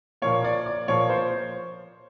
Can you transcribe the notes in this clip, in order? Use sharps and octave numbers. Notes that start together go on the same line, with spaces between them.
A#2 F3 A#3 C#5
D5
D5
A#2 F3 A#3 C#5
C5